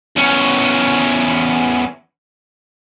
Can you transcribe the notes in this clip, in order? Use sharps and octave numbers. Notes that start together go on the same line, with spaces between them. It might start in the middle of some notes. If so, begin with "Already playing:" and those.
E2 C#4